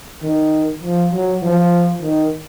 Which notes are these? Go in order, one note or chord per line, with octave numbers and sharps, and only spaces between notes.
D#3
F3
F#3
F3
D#3